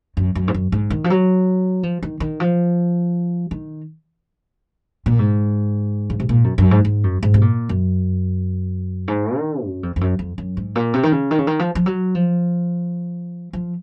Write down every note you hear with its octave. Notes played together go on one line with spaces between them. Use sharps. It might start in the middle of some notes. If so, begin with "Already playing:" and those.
F#2
F#2
G#2
F#2
G#2
D#3
F3
F#3
F3
D#3
D#3
F3
D#3
A#2
G#2
C#3
C3
A#2
F#2
F#2
G#2
G#2
F#2
G#2
C3
A#2
F#2
G#2
D#3
F#2
F2
F2
F#2
F2
F#2
G#2
A#2
C3
D#3
C#3
D#3
C#3
D#3
F3
F3
F#3
F3
F3